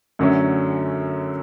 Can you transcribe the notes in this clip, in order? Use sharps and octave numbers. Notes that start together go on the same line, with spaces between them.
F#2 D3 F#3 A3 C#4